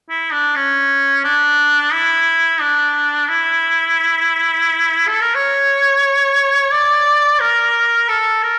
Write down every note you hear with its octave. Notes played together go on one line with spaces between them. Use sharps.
E4
D4
C#4
D4
E4
D4
E4
A4
A#4
C#5
D5
A#4
A4
A#4